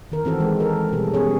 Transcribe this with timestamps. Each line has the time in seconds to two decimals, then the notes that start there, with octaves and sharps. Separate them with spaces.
0.12 D#3 A#4
0.25 E3 C4 F#4 A4
0.40 G#3
0.60 A4 A#4
0.92 B2 G3 G#4
1.14 G3 B3 C#4 G#4 C#5